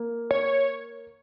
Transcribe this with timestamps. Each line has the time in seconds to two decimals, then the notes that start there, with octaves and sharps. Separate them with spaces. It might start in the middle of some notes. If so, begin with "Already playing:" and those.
Already playing: A#3
0.31 C#5